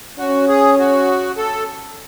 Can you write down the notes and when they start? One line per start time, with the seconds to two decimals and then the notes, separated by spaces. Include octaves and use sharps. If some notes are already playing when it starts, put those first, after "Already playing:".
0.18 C#4 F#4
0.49 G#4
0.78 F#4
1.37 A4